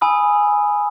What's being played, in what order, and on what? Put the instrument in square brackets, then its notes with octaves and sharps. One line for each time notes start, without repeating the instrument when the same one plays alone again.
[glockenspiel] G#5 B5 D#6 E6